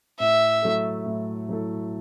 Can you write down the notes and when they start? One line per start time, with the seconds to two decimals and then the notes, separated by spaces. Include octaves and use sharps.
0.20 A2 E5
0.62 F#3 A3 E4 A4
1.06 A2
1.49 F#3 A3 E4 A4